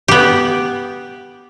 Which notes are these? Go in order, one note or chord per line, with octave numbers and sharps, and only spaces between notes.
B3 G4